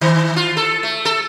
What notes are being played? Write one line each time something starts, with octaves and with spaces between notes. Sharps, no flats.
D#3
F4
A4
A3
A4